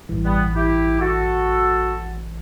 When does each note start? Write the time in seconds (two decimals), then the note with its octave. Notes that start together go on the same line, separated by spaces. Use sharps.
0.09 A1 G2 E3
0.25 G3 B3
0.55 E4 G4
1.00 F#4 A4